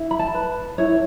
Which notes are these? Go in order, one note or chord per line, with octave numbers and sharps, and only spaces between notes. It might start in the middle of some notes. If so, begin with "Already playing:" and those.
Already playing: E4
B5
A5
B4
E4 C#5